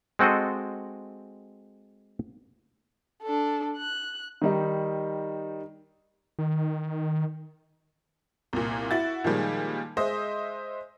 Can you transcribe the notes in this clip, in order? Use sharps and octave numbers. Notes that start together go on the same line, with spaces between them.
G#3 C4 F#4 A4 D#5
D4 A4
F#6
D#3 G3 D#4
D#3
C2 A#2
E4 F#4 A6
A#2 D#3 F3 G3 G#3
G#3 C5 D#5 E5